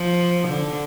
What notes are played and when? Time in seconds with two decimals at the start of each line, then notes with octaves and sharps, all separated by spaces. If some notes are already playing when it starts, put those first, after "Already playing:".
Already playing: F3
0.48 D3